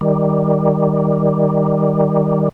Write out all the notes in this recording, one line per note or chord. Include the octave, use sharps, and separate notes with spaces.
D#3 G3